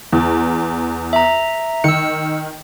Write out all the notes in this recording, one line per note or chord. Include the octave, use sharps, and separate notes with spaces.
E2
E5 A#5
D#3 E6 C#7